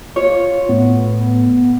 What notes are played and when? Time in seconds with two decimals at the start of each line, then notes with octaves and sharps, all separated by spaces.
0.16 F4 C#5
0.69 A2 B3